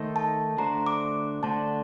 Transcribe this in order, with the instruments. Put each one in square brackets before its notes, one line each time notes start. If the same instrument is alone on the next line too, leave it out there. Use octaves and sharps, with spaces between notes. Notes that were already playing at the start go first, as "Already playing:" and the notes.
Already playing: [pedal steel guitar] D#3 A3 D#4 A4 C5
[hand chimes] A5
[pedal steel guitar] D3 A3 D4 F#4 C5 [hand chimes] A#5
[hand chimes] D6
[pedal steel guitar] D3 A3 D4 F#4 C5 [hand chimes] A5